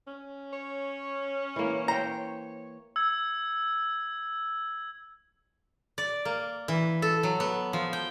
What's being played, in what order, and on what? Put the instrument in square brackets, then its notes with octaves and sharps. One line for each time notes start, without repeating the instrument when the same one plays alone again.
[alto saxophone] C#4
[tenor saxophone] C#5
[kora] E3 A#3
[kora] C5 G5 [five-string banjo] A#5
[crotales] E6 G#6
[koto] D5
A#3
E3
A4
F#3
B3
F3
G5